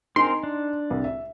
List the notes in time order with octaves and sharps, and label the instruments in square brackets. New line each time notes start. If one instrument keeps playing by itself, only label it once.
[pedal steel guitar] C4 A#4 [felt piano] D#4 G#5 [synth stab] C6
[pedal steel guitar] D4
[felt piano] C2
E5